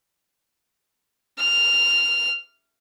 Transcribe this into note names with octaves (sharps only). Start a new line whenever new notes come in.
F6